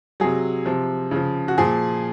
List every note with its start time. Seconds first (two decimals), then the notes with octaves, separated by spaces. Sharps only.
0.20 C3 F#3 G#4
0.66 C3 F3
1.11 C#3 F3
1.48 F#4
1.58 A#2 F3 G#4